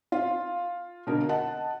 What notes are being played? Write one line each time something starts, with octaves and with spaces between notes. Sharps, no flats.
F4
B2 D3 A#4
D#5 F#5 A5